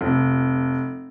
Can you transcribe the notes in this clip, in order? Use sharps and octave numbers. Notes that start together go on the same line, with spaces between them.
F1